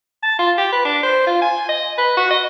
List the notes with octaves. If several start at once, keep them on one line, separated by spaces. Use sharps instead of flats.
A5
F4
G4
B4
D4
C5
F4
G#5
D#5
B4
F#4
D#5